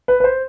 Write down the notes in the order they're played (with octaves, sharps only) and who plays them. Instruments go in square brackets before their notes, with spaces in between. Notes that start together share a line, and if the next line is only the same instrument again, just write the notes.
[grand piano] B4
B4
C5